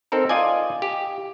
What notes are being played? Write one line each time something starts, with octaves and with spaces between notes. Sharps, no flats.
C4 D#4 A4 A#4
F4 D5 D#5 G#5
G4